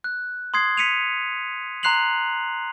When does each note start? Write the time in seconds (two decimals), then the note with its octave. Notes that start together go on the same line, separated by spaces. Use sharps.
0.04 F#6
0.54 C6 D#6 G#6 C7
0.77 B6 C#7 D#7 F7
1.83 A#5 C6 F#6 C7 F7 F#7